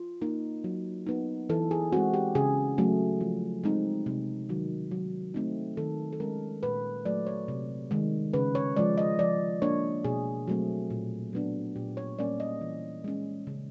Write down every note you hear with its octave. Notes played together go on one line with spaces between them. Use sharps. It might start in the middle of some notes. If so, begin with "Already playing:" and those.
Already playing: F4
A#3 D#4
F#3
B3 D#4
E3 A4
G#4
G#3 C4 F#4
G4
C#3 G#4
F#3 A3 C#4
F3
G#3 C4 D#4
C3
D#3 F#3
F#3
A3 C4 D#4
D#3 A4
A4
G#3 C#4 A#4
A#2 B4
F#3 A3 D5
C#5
C3
D#3 G#3
C#3 B4
C#5
F3 G#3 D5
D#5
F3 D5
A#3 D4 C#5
B2 G#4
F#3 A3 C4
A#2
F#3 B3 D4
A#2 G4
C#5
G3 A#3 C#4 D5
D#5
E3
G#3 C#4
C#3